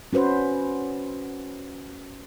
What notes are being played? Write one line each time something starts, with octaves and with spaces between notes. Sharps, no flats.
C#4 F#4 B4 C5